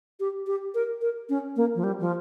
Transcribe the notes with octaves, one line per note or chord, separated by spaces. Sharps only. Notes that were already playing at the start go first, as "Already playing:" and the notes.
G4
G4
A#4
A#4
C#4
A#3
F3
G3
F3